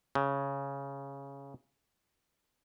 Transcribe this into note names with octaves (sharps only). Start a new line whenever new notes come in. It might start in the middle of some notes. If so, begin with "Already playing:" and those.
C#3